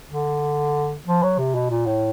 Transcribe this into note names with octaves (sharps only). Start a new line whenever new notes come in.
D3
F3
F#3
C3
B2
A#2
A2